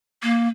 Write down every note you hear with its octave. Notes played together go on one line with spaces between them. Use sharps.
A#3